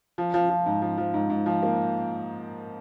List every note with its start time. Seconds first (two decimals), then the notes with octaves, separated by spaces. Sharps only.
0.18 F3
0.34 F3
0.50 F3
0.66 G#2
0.82 F3
0.98 F3
1.14 G#2
1.30 G#2
1.46 F3
1.63 A#3